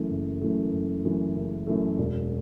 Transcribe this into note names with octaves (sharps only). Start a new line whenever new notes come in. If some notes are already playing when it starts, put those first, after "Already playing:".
Already playing: F#1 F#2 E3 A3
F#1
F#2 E3 A3
F#1
F#2 E3 A3
F#1
F#2 E3 A3
E1